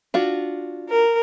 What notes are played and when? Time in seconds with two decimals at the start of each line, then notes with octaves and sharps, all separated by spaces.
0.14 D4 F4 F#4
0.89 A#4